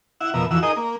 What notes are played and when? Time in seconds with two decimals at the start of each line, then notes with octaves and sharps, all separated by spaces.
0.21 E4 E5 F#5
0.34 F2 B2 A#4 E5
0.51 F2 E3 F#4 E6
0.63 D#4 G#4 A#4 D#5
0.76 A#3